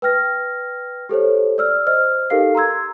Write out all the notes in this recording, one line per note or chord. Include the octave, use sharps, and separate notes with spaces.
B4 G5 F6 A#6
G4 A4 C5 C#5
D5 E6 F6
C5 D#5 F6
D#4 G4 A4 A#4 F5 C7
A#5 C6 E6 G#6